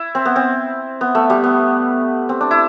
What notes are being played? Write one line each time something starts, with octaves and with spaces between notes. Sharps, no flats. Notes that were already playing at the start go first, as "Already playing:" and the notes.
Already playing: E4
C4
B3
C4
B3
A3
G3
B3
C4
D4
E4